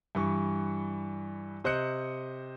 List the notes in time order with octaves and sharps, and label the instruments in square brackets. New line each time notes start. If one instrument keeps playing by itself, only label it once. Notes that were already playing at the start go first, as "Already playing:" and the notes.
[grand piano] G2 E3 C#6
C3 C5 D#5 F#6 C#7